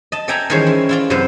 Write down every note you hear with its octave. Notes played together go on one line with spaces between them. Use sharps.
D#5 A5
A4 D5 E5 G5 G#5 A#5
D#3 E3 G3 G#3 C#4 C5
E4
E4 F4 D5
F#2 C3 B4 C5